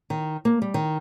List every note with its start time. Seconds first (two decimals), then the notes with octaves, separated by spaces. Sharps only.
0.10 D#3
0.45 A#3
0.62 G3
0.74 D#3